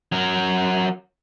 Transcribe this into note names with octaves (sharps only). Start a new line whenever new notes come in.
F#3 A#4